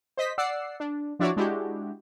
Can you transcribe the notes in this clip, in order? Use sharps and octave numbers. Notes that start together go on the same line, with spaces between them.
C5 D#5 B6
D5 F#5 E6 C7
D4
F3 D4 E4 F#4 C#5 D5
G#3 D4 E4 F#4 G4